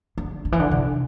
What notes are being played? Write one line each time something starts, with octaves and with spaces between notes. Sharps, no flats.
D3
D3
E3
D3
C3